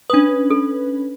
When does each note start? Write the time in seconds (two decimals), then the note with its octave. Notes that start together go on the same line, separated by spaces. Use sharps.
0.10 C#4 D4 B4 D#6
0.50 A4